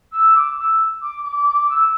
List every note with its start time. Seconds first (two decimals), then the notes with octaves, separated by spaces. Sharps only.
0.12 E6
0.34 D6
0.57 E6
1.01 D6
1.24 D6
1.47 D6
1.69 E6